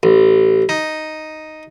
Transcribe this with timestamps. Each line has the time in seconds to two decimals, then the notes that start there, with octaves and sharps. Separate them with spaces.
0.03 A1
0.69 D#4